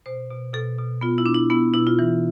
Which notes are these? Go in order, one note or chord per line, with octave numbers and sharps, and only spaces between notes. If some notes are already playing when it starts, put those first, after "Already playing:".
B2 C5
B2
B2 A4
B2
B3 F4
E4
D4
E4
B3 E4
B2 E4
F4
E3